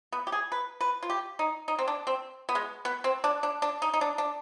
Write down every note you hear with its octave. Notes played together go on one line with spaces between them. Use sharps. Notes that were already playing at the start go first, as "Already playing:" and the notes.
B3
G4
G#4
B4
B4
F4
G4
D#4
D#4
C4
D4
C4
B3
G#3
B3
C4
D4
D4
D4
D#4
D#4
D4
D4